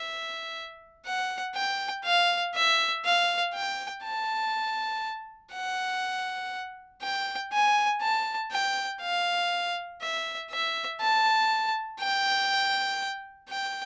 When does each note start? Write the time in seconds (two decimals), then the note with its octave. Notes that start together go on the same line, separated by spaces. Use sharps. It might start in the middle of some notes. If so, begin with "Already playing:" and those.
Already playing: E5
1.05 F#5
1.55 G5
2.04 F5
2.55 E5
3.05 F5
3.54 G5
4.04 A5
5.53 F#5
7.02 G5
7.53 G#5
8.02 A5
8.52 G5
9.01 F5
10.02 E5
10.51 E5
11.01 A5
12.01 G5
13.49 G5